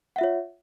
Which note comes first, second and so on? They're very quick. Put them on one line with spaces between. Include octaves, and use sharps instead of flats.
F#5 E5 F4 C#5